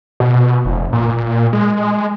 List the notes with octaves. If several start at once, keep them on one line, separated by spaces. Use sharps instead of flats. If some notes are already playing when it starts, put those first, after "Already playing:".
B2
F1
A#2
G#3